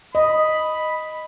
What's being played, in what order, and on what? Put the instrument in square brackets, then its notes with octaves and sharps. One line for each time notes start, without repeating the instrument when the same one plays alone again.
[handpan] D#5 [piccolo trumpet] B5